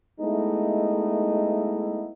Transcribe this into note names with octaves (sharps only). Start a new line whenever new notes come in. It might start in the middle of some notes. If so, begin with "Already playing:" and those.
G#3 A3 B3 D#4 E4